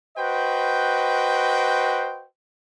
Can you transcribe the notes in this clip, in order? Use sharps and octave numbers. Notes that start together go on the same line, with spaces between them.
F#4 B4 C5 D#5 G5